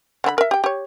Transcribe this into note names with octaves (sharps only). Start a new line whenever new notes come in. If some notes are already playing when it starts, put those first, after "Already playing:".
D3 C4 B5
A#4 E5
G4 G5
G4 C#5